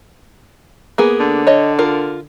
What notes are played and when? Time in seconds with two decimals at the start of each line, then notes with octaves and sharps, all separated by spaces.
0.98 A#3 B3 G#4
1.20 D3
1.47 C#5 D#5
1.79 F4 A#4